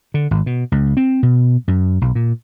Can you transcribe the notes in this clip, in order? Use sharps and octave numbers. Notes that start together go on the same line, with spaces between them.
D3
G#1
B2
C#2
C4
B2
F#2
B1
A#2